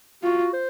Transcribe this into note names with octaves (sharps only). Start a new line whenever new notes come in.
F4 F#4
C5